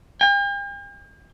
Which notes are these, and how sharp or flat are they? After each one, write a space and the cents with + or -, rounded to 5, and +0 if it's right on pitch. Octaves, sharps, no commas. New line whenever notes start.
G5 +45